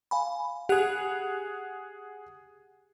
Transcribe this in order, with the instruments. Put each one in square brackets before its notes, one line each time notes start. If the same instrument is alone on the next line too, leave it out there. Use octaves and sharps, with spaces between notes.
[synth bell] F5 G#5 B5
[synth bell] G4 F#6 F7 [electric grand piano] G#4 F#5